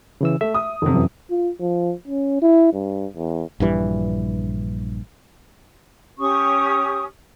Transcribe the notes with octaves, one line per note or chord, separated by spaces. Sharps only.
C#3 E3 E6
A3 E5
D#6
F1 C3 D#3
F#2 E3
F4
F3
C#4
E4
G2
E2
A#1 G2 E3 G3
C#4 G4 C#6 D#6